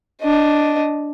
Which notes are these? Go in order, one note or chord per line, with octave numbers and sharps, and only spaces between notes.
D4 D#5